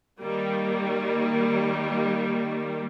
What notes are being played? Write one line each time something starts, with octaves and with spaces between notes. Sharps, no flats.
D#3 G3 A#3